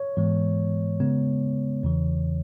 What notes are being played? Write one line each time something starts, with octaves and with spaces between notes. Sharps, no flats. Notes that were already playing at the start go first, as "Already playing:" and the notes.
Already playing: C#5
G#2 E3 G#3 B3
C#3 G#3 B3
E2 C#3 E3